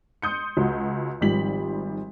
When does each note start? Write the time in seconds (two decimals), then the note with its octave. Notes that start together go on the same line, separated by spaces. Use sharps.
0.22 C6 D#6 G6 C#7
0.57 C#2 F#4
1.21 G#1 G#2 F3 G3 B6 F#7